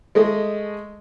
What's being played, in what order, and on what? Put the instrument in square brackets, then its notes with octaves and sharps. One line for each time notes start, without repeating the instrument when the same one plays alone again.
[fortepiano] G#3 A3 D#5